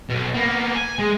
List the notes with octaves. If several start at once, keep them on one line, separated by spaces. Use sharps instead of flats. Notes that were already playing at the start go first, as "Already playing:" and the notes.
B1 B2
A#3 B3
G#5
G#3